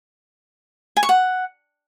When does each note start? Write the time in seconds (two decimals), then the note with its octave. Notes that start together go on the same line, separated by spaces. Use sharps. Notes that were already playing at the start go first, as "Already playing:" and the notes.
0.97 G#5
1.03 C#6
1.09 F#5